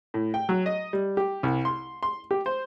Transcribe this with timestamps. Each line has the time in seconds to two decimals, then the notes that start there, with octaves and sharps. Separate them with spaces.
0.14 A2
0.34 G5
0.49 F#3
0.66 D#5
0.93 G3
1.17 G4
1.43 C2
1.65 C6
2.03 C6
2.31 G4
2.46 C5